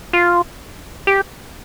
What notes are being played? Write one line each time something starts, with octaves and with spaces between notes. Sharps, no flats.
F4
G4